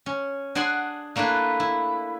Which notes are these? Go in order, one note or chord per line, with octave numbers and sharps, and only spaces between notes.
C#4
D4 G#4 F#5 G#5 C6
A3 A#3 D4 E4 B4
E4